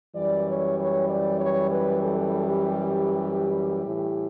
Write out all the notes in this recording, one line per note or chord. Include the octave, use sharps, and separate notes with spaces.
F#2 E3 G3 D5
C#5
C#5
D5
C#5
B4
A4
G4
A2 E3 G3